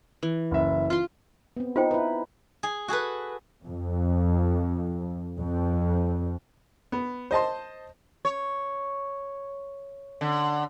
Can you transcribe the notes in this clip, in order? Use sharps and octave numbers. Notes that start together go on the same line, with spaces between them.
E3
F#1 E5
F4 C6
B3 C4
D#4 F4 C5 G5
E4 B4
G#4
F#4 G#4 A4 B4
F2
F2
B3
C5 D#5 A5 C6
C#5
D3